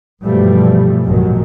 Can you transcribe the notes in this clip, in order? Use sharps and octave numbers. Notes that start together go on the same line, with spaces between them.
G2 B2 E3 F3 G3 A3
G#1 F2 A#2 D#3 F#3 G#3